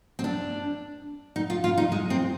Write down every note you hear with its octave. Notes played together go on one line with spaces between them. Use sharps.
C4
D4
D#4
F4
F4
D#4
G#3
C4